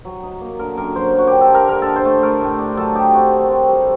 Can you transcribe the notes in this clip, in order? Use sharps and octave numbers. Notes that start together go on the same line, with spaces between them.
F#3
D#4
A#3
D3 A#4
F#2 A#4
F#3 C5
F#3 F#4
D3 G4
A4
A#3 A#4
D3 A#4
D#4 A4
C5
A3
A3 A#4
A2
D4
F#3 A4
D#4 G4
C4 F#4
D#3
C4
G3